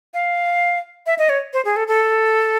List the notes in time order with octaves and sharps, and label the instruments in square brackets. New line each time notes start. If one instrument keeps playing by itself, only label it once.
[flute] F5
E5
D#5
C#5
C5
G#4
A4
A4